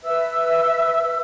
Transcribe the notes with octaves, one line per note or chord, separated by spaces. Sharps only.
B4 E5 E6